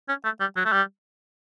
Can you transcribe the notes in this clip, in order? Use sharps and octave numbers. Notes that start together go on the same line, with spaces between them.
C#4
A3
G3
F#3
A3
G3